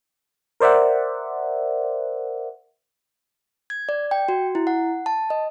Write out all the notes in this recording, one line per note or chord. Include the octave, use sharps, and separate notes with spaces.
A#4 C5 D5 E5 F#5
G#6
D5
G5
F#4
E4
F#5
A5
D#5